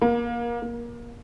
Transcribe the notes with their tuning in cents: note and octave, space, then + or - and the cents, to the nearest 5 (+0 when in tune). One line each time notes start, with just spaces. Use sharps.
A#3 +25
A#3 +20